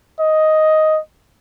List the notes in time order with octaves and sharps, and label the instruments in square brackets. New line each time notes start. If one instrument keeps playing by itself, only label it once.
[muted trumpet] D#5